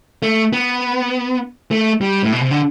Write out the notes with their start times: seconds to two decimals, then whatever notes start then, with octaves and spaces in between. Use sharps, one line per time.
0.23 A3
0.53 B3
1.71 A3
2.01 G3
2.23 A2
2.32 B2
2.41 C3
2.51 D3